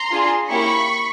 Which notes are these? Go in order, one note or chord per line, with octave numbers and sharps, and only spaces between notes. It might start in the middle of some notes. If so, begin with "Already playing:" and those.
Already playing: A#5 C6
D4 F4 G#4
A#3 C#4 E4 G4 B5 C#6